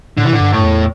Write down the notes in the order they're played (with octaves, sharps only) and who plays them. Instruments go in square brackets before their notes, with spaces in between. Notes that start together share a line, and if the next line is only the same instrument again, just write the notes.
[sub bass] A2 [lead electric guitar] D3
[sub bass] C3 [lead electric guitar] E3
[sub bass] A2 [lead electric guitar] D3
[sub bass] G2
[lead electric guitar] A2
[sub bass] G2
E2